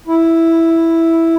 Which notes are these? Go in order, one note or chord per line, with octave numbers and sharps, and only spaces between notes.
E4